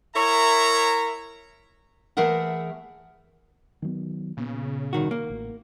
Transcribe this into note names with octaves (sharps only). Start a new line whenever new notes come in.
E4 A#4 C#5 E5 A#5
E3 A3 G#4 A#4 E5 F#5
D#3 F#3 B3
A#2 C#3 A#3 B3
C2 D#3 F#4
A#3
A1